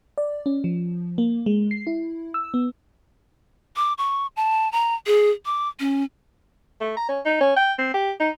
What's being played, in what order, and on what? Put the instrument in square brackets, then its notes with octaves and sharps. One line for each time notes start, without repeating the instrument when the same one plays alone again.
[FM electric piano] D5
C#4
F3
A#3
G#3
C7
E4
E6
B3
[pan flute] D6
C#6
A5
A#5
G#4
D6
C#4
[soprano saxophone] A3
A#5
C#4
D#4
C#4
G5
C4
G4
D#4